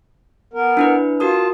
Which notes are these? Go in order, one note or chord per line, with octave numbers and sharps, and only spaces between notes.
B3 A#4
D4 E4 B4
F4 F#4 A#4 A5 D#6